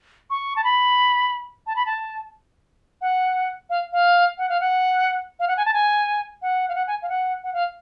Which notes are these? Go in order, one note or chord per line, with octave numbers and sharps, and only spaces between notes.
C#6
A5
B5
A5
B5
A5
F#5
F5
F5
F#5
F5
F#5
F5
F#5
G#5
A5
G#5
F#5
F5
F#5
G#5
F5
F#5
F#5
F5